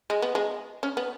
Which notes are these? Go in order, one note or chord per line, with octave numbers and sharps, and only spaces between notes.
G#3
B3
G#3
C#4
B3